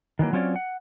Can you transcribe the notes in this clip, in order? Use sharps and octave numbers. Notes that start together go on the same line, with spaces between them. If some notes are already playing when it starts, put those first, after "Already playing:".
D#3 E3 F#3 A#3
F#3 C4 C#4 F4 C#5 D5
F#5